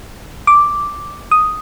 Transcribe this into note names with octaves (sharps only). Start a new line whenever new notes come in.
D6
D#6